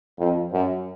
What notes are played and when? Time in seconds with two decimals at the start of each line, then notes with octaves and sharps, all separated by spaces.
0.19 F2
0.53 F#2